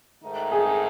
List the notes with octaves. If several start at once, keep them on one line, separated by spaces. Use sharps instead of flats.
G#2 D#3 A3 D#4
G#4